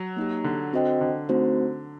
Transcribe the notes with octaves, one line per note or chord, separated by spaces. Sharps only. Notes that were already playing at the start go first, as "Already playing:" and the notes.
Already playing: F#3
A#3 D#4 G4
D3
C4 F#4 C5 D#5 G5
D3
A3 C4 D#4 F#4 C5